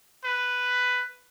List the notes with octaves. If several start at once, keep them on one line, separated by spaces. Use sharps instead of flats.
B4